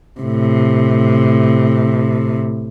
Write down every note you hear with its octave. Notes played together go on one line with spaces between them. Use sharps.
A2 C3